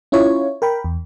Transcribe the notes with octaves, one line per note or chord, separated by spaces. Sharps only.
C#4 E4 F4 C#5
A#4 G5 B5
E2